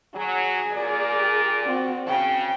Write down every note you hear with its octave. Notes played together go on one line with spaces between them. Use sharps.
F#3 G#4
A#2 A#4 D5
C4 F#4
C#3 G5